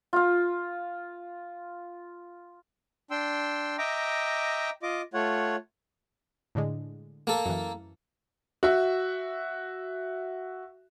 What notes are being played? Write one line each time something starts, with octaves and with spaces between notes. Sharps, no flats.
F4 F5
D4 G5 C6 E6
D#5 E5 G5 A#5 D6
F4 D#5 D6
A3 F4 C#5 F#5
A2 D3 G#3
A#3 A4
F#2 E3
F#4 E5